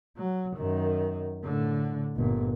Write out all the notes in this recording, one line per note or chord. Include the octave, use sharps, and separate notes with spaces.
F#3
F#2 D#3
A2 D3
G1 A#2